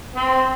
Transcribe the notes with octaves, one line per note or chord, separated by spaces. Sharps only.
C4